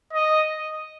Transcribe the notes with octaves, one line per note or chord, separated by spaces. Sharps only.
D#5